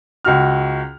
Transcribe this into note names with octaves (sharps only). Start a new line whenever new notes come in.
C#2 F#4 F6